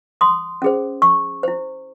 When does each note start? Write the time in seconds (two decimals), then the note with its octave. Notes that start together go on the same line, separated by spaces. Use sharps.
0.21 C6 D#6
0.62 C#4 G#4 C5
1.02 C#6 E6
1.43 E4 C5